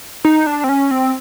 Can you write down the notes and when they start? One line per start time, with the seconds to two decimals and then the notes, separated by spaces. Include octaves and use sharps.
0.25 D#4
0.47 D4
0.64 C4
0.69 C#4
0.91 C4